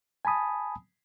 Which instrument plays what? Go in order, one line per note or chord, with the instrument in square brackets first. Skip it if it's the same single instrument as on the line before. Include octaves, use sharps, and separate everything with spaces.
[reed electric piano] G#5 A5 B5 D#6